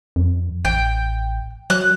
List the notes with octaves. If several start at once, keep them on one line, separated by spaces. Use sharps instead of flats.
F2
A1 G5
F#3 F#6